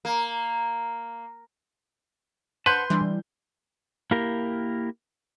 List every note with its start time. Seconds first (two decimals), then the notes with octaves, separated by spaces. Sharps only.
0.05 A#3
2.66 B4 C5 F#5 A5 C6 G6
2.90 E3 G3 D4
4.11 A#3 E4 G4 A#4